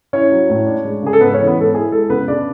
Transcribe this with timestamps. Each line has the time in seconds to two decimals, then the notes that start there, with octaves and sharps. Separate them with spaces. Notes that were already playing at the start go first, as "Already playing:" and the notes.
0.13 C#4 E4 C#5
0.32 F#3
0.50 A2
0.67 D4
0.85 G#3
1.02 C#3 G#4
1.13 A4
1.20 G#2 B3 B4
1.34 C#4 C#5
1.39 E3
1.47 B3 B4
1.57 G#2 A4
1.74 E4 G#4
1.92 G#3 A4
2.09 C#3 B3 B4
2.28 C#3 D4 D5